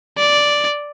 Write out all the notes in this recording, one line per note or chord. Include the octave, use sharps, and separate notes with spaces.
D5